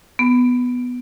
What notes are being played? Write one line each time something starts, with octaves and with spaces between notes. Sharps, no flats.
B3